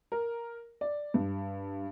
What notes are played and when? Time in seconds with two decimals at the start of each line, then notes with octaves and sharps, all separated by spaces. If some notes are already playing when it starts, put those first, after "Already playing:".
0.12 A#4
0.81 D5
1.14 G2